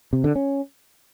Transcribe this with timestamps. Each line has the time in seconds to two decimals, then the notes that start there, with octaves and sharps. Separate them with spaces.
0.13 C3
0.24 D3
0.35 C#4